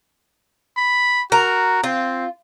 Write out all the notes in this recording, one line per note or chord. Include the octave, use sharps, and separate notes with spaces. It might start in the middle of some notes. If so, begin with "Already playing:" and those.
B5
F#4 A#4
C4 F4